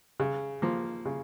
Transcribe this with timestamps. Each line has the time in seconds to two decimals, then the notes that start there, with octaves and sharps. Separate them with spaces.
0.20 C#3
0.62 F3 A#3
1.05 C#3